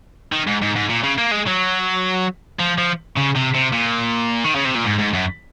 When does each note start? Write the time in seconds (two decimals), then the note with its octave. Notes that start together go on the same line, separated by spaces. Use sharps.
0.32 D#3
0.47 G#2
0.62 G#2
0.75 G#2
0.89 A#2
1.03 C#3
1.18 A#3
1.31 G#3
1.47 F#3
2.60 F3
2.78 F3
3.16 C#3
3.35 C3
3.54 C3
3.72 A#2
4.45 D#3
4.55 C#3
4.65 C3
4.75 A#2
4.86 G#2
5.00 G#2
5.14 F#2